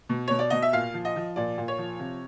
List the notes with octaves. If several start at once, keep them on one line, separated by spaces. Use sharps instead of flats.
B2
B2 C#5
D5
B2 D#5
E5
A#2 F5
F3
D#5
F3
A#2 D5
A#2
C#5
F3
C3